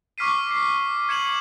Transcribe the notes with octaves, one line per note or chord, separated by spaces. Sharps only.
C#6 D6 F6 B6 C7 D#7
C7
G#6 C#7 E7 F#7